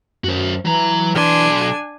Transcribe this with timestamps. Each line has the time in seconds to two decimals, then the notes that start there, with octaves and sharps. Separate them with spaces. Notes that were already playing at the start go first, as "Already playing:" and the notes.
0.24 F#2 F#4 C5
0.65 E3 F#3 A#5
1.15 B1 D4 G#5 C6